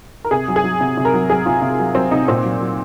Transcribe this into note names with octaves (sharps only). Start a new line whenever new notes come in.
A#4
C3 G#4
F#3
G#4
F#3
C3
C3
A#4
F#3
F#3 G#4
C3 F4
C3
F#3
F#3 C4
C3 D#4
A#2 C4
F#3
F#3